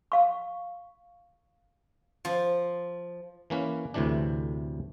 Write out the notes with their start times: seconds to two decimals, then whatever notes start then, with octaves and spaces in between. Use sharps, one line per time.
0.12 F5 C#6
2.25 F3
3.50 E3 A#3 C#4 B4
3.94 D2 A2 C3 E3 D4